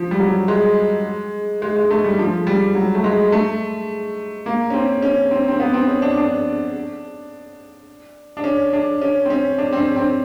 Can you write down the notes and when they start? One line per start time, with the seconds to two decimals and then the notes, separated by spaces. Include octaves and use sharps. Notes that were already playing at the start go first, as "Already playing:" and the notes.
Already playing: F3
0.11 G3
0.20 F#3
0.48 G#3
1.62 G#3
1.76 G#3
1.91 A3
2.04 G3
2.19 F3
2.47 G3
2.75 F#3
2.95 A3
3.04 G#3
3.32 A3
4.46 A#3
4.70 C#4
4.74 C4
5.02 C#4
5.31 C4
5.48 C4
5.60 B3
5.73 C4
5.88 C#4
6.02 D4
6.17 D4
8.37 D4
8.44 C#4
8.73 D4
9.01 C#4
9.25 C4
9.30 C#4
9.58 D4
9.72 C4
9.78 C#4
9.96 C4